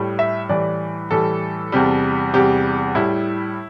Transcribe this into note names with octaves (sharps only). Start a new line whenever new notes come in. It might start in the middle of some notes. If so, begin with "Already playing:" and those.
Already playing: A2 G3
E5
A2 E3 G3 D5
A2 E3 G3 A4
E2 C3 G3
E2 C3 G3 G4
A2 G3 E4